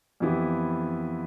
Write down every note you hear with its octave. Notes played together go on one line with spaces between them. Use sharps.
F2 E3 B3 E4 G4